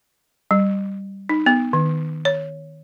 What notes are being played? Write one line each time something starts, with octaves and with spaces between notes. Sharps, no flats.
G3
D#4
B3
D#3
C#5